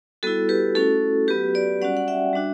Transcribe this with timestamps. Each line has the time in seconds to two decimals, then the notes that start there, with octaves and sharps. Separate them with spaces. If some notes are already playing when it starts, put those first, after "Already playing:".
0.23 G3 B3 E4 F#4 A4
0.49 G4 B4
0.75 A3 C#4 E4 F#4 A4
1.28 F#3 B3 F#4 G4 B4
1.55 B4 D5
1.82 G3 C#4 F#4 D5 F#5
1.97 F#5
2.08 E5 G5
2.33 G3 D4 F#4